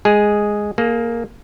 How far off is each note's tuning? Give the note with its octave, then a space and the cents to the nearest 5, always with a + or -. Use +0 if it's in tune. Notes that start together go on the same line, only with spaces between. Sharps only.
G#3 +0 G#4 +0
A#3 +0 G#4 +35